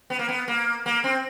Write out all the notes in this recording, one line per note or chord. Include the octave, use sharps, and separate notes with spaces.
B3
A#3
B3
A#3
A#3
C4